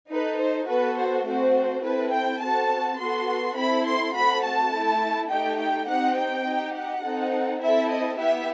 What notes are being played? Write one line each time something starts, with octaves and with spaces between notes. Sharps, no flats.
D#4 A4 B4
C5
B3 F#4 A4 B4
C5
A3 C4 F#4 C5
C4 E4 A4 B4
G5
C4 F#4 A4 A5
B3 F#4 A4 C6
C4 E4 A4 B5
C6
A3 C4 F#4 A4 B5
A5
A3 E4 A4
A3 D#4 G4 G5
G5
C4 D#4 G4 F#5
G5
D#4 G4
F#5
C4 D#4 A4
C4 E4 A4 E5
D#5
B3 E4 G4 E5